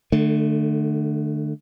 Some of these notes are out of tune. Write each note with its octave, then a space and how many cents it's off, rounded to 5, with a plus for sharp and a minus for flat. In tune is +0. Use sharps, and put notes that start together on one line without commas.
D3 +30 A3 +0